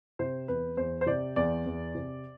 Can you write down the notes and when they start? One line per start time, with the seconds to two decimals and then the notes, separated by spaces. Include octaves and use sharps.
0.19 C3 C5
0.48 E2 B4
0.77 E2 C5
1.01 C5
1.06 C3 D5
1.36 E2 D5
1.66 E2
1.95 C3